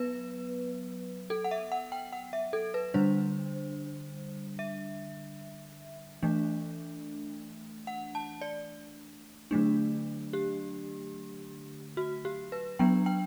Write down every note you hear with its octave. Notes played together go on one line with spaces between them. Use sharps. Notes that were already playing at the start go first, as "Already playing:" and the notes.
Already playing: F#3 B3 B4
A4
F#5
E5
F#5
G5
F#5
E5
A4
B4
D3 G3 D4 C5
E5
E3 A3 D4
F#5
A5
D5
D3 F#3 A3 D4
G4
F#4
G4
B4
F#3 B3 D4 G5
G5